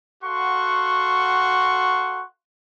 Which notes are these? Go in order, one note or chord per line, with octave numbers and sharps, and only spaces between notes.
F#4 A4 F5 F#5 C6 C#6